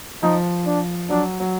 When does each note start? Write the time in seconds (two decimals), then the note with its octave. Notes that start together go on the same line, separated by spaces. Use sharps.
0.23 F3 D#4
0.66 D4
1.10 F#3 D4
1.40 F#3